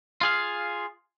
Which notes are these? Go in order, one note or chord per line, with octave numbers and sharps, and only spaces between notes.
F4 G#4 F5